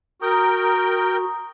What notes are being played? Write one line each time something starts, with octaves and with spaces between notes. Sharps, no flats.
F#4 A#4 G5 A#5 D#6